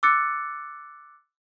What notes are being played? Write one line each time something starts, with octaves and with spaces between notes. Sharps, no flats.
D6 E6 F#6 A6 C#7